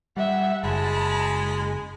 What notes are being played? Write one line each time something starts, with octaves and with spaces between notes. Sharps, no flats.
G3 E5 F#5
F#1 G#3 A5 B5